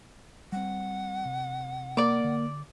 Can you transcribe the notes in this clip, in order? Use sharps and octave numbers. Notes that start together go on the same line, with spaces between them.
G3 C4 F#5
C3
A#3 D5 D6
D3